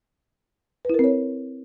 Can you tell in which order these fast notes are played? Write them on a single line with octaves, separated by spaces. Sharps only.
B4 E4 A#4 C4 C#5